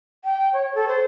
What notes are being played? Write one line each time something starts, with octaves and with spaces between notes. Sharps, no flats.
G5
C#5
A4
C5